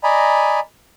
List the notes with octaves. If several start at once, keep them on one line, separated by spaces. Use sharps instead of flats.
D5 D#5 G#5 A#5 B5